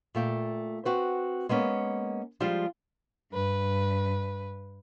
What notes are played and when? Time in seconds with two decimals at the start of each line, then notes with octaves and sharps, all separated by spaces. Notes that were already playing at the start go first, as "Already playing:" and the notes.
0.15 A#2 A3 G5
0.85 C4 F#4 B4
1.49 G#3 A#3 B3 C#4
2.40 F3 G3 G#3 F4
3.33 G2 B4